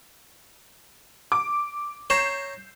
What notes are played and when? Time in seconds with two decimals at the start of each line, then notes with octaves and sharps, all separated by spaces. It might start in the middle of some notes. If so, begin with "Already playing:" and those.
1.32 D6
2.10 C#5 A#5 G6 C7 E7